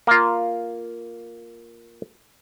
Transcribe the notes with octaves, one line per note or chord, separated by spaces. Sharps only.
A#3 F4